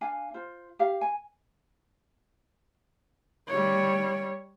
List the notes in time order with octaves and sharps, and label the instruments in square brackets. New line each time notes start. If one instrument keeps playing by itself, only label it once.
[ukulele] D4 F5 G#5
F4 C5
G4 F5
G#5
[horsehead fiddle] G3 C#5